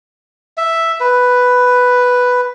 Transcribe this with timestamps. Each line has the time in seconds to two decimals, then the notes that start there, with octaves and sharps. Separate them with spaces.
0.57 E5
1.00 B4